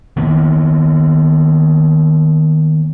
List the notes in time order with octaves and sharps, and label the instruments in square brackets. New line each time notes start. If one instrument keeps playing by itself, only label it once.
[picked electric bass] D#3 A#3 B3